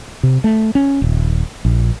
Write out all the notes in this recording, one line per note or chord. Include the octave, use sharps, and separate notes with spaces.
C3
A3
C#4
D#1
A#1